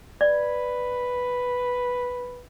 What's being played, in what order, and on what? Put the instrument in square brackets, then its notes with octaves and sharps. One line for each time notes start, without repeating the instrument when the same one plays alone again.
[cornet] B4 [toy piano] D5